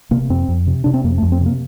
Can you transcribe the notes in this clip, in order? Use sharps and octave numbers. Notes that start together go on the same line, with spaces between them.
C3 A#3
F2 C4
F2
C3
C3 D4
C4
F2 A#3
A3
F2
C4
C3
A#3